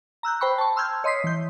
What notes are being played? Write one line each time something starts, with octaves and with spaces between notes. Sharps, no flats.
A#5 E6 F#6 G6
C5 G5 A#5 B5 C#6
A5 C#6
C6 E6 F6 G6 G#6
C#5 D#5 C6 D#6 B6 C7
E3 G6